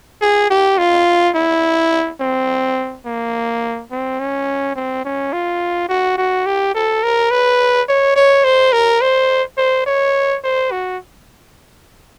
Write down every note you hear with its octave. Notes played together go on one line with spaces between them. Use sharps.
G#4
G4
F4
E4
C4
A#3
C4
C#4
C4
C#4
F4
F#4
F#4
G4
A4
A#4
B4
C#5
C#5
C5
A#4
C5
C5
C#5
C5
F#4